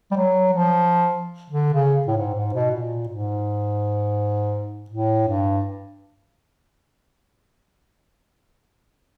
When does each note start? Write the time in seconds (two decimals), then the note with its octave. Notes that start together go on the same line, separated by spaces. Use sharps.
0.11 G3
0.16 F#3
0.53 F3
1.50 D3
1.74 C#3
2.07 A2
2.17 G#2
2.35 G#2
2.54 B2
2.71 A#2
3.08 G#2
4.90 A2
5.27 G2